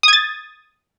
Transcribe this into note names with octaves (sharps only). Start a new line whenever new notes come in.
D#6 G#6 A6